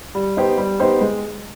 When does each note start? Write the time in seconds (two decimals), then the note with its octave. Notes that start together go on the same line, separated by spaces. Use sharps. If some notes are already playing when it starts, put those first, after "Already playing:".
0.15 G3
0.37 B3 D#4 G4 C5
0.58 G3
0.80 B3 D#4 G4 C5
1.01 G#3